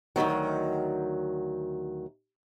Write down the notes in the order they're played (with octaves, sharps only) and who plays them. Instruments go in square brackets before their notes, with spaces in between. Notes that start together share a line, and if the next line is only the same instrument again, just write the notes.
[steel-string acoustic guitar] D2 A#2 D#3 F#3